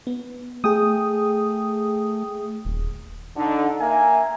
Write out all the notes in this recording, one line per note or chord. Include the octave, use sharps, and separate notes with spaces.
B3
A3 G#4 G5 D#6
D#1
D3 D#4
A#3 A#4 E5 G#5